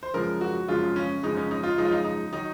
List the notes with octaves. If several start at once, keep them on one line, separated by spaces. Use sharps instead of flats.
C5
F#2 C#3 F3 G#3 A#4
F#4
F#2 C#3 F3 G#3 F4
C#4
F#2 C#3 F3 G#3 D#4
C#4
D#4
F4
F#2 C#3 F3 G#3 D#4
F4
D#4
D#4
D#3 F#3 D#4